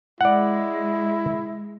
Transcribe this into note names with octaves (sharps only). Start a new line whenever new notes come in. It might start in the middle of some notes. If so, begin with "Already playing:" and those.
G#3 E4 D5 F#5